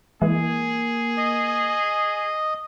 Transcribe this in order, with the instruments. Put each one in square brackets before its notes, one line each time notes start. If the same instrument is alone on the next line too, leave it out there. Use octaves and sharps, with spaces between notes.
[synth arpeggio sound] E3 G#3 [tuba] A#3 [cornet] G#4
[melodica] D#5